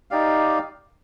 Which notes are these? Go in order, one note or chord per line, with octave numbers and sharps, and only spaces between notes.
D#4 G4 D5 F5